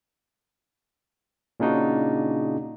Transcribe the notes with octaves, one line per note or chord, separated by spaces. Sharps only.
A#2 C#3 D4 D#4 F#4